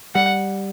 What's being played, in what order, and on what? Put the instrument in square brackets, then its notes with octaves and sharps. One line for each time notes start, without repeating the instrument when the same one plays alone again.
[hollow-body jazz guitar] G3 [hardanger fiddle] F#5